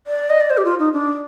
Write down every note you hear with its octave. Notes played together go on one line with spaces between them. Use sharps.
D5
D#5
D5
C5
G4
F4
D#4
D4